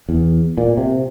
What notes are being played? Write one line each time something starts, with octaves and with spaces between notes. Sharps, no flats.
E2
A#2
C3